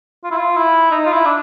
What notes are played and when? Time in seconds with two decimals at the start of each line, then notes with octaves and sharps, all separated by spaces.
0.24 F4
0.31 E4
0.38 F4
0.57 E4
0.91 D#4
1.06 F4
1.13 E4
1.26 D4